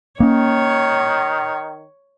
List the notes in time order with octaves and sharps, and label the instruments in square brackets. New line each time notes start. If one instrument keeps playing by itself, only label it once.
[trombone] D#3 [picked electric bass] A#3 C#4 [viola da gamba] C#5